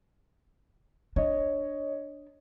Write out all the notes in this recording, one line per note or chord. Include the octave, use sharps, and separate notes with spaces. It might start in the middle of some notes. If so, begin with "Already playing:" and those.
D4 C#5 D#5